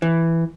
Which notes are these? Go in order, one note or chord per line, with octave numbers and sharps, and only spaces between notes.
E3